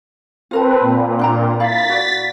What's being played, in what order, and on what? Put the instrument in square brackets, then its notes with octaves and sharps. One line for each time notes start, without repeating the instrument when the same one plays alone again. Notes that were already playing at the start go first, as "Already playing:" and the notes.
[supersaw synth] C4 B4 [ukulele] F4 A#4 A5
[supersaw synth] A#2
[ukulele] D4 G5 A#5
[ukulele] E4 F5 B5 [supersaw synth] A6 B6
[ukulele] F#4 D5